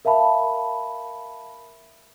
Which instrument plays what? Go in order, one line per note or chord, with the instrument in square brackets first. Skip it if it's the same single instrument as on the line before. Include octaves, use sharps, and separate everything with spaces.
[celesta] A#4 E5 F5 A5 B5